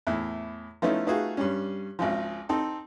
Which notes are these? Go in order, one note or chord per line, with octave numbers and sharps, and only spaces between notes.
E2 A2
F3 A3 B3 C#4 D#4 E4
A3 B3 D#4 F4 F#4 G#4
G2 G3 C#4
G#1 C#2 F3
C4 D#4 A4